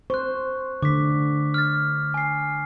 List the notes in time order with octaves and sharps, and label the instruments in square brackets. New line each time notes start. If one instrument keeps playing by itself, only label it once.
[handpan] C5 [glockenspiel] C#6 F#6
[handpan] D3 [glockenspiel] D6 B6
[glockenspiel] F6 A6
G#5 C7